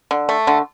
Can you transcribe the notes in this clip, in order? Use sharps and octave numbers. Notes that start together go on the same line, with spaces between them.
D3
A3
D3